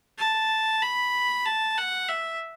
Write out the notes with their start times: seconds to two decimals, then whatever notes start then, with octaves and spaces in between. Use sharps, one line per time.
0.18 A5
0.82 B5
1.46 A5
1.78 F#5
2.09 E5